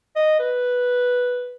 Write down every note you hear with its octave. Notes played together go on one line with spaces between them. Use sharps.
D#5
B4